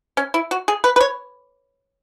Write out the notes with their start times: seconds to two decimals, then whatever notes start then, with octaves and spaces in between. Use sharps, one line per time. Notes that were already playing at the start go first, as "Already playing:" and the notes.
0.17 C#4
0.34 E4
0.51 F#4
0.68 G#4
0.84 B4
0.96 B4
1.01 C#5